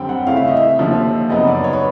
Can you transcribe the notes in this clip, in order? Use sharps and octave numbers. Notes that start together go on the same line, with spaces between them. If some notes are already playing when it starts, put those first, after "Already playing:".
Already playing: F#2 D3 G3 C4 G5
F#5
C#3 E3 A3 C#4 F5
E5
D#5
E5
D#2 D3 F3
F#2 C#3 F#3 B3 D#4 D#5
D5
C#5
B4